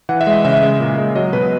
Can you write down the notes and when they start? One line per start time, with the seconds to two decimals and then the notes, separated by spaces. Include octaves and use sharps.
0.09 E3 F#5
0.21 E5
0.27 G#3
0.33 D#5
0.44 C#3 E5
0.62 G#3
0.80 A#2
0.98 G#3
1.15 F#3 D#5
1.33 B2 B4